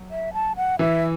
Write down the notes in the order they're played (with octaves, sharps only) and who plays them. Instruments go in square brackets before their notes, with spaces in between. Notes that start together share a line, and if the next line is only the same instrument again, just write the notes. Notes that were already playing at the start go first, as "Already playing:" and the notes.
Already playing: [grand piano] F#3
[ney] E5
A5
F#5
[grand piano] E3 [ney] E5